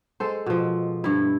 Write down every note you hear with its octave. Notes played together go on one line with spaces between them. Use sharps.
G#3 A4 C5
B2 F3
G2 E4